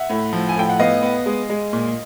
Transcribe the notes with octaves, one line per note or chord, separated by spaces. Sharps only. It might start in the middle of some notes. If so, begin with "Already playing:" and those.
Already playing: E5 F#5
A2
F3
G#5
A2 G5
F#5
B3 D#5 F5
B3
G#3
G#3
A#2